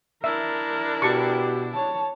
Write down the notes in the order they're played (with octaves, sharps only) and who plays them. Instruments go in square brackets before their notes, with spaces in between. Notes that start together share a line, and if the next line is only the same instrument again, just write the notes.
[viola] D4 E4 [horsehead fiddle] A#4 [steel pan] E5
[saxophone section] B2 G4 [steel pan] A5 C#6
[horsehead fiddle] C#5 A5